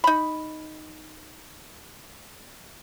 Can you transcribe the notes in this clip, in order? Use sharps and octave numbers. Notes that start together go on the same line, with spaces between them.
D#4 B5